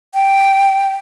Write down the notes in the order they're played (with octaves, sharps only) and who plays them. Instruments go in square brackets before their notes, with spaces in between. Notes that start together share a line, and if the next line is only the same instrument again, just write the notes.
[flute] G5